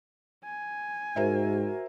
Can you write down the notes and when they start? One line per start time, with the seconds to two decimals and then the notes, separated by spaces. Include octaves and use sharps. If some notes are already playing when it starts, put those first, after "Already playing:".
0.44 G#5
1.16 G#2 F#4 A#4 C5 E5